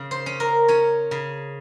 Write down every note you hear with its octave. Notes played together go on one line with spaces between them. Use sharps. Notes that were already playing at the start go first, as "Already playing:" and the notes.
Already playing: C#3
C5
C#4
A#4
C#4 C#5
C#3